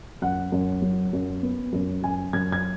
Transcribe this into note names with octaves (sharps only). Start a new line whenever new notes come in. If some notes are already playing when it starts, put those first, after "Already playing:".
F#2 F#5
F#2
F#3
F#2
B3
F#2
F#2 G#5
F#2 G#6
G#6